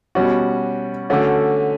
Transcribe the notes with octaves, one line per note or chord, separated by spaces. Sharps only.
B2 G3 C#4 F#4
D3 A3 C#4 F#4